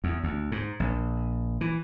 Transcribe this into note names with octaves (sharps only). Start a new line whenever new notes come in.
E2
D2
G#2
A#1
E3